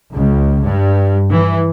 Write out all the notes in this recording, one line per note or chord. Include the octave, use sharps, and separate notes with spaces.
C#2
G2
E3